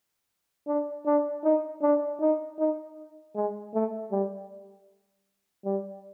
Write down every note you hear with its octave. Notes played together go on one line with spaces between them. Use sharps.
D4
D4
D#4
D4
D#4
D#4
G#3
A3
G3
G3